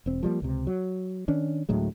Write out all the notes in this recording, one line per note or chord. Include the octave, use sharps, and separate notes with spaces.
E1 C4
F3 G3 G#3 A#3
C#2 C3
F#3
D#3 C#4 D4
D2 A2 F#3 G#3